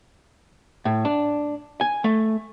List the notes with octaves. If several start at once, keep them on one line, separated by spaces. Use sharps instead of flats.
A2
D4
G#5
A3